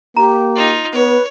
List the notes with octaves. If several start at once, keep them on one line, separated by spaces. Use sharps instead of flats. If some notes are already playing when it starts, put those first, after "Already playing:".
A#3 G4 A#5
D#4 F4
B3 B4 C#5